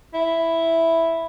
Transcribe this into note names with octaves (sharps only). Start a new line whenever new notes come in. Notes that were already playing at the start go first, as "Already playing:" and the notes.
E4